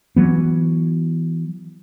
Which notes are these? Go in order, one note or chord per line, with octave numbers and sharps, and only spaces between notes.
E3 F#3 B3